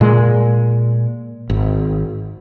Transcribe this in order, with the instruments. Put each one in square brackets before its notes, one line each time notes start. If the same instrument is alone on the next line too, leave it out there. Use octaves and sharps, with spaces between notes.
[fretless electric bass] A#2 G#3
G#1